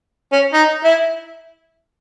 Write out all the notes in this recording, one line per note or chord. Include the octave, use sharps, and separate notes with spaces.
C#4
D#4
E4